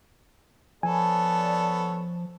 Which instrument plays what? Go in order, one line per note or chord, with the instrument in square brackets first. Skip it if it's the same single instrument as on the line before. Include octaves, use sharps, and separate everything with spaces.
[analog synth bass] F3 [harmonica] B3 A4 C#5 [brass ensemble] D5 A5 [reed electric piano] G#5